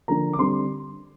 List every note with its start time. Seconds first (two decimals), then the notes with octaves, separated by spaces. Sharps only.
0.08 D3 F3 A#3 A#5
0.33 D6
0.39 D3 G3 C4 C6